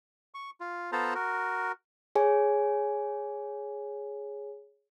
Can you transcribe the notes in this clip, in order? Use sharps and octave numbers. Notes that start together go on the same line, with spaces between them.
C#6
F4
B3 F4 A4 C5 A5 A#5
F#4 A#4
G#4 C#5 G#5